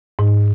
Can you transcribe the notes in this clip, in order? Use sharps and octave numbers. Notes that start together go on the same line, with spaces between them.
G#2